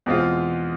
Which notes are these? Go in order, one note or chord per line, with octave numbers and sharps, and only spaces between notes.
E2 B2 G#3 C4 F4